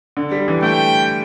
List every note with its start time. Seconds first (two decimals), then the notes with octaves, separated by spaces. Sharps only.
0.17 D3
0.31 G3
0.48 E3
0.62 A3 G5